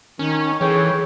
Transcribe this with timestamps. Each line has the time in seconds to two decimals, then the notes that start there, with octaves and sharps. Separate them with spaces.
0.19 D#3 C#4
0.61 E3 G#4 A4 C#5 G5